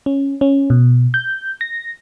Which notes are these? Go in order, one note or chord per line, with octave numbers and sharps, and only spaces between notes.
C#4
C#4
B2
G6
A#6